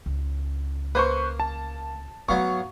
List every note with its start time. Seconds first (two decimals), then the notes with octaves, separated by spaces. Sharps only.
0.06 C#2
0.95 A#3 B4 C5 C#6
1.40 A5
2.29 G#2 F#3 A3 B3 F5 C#6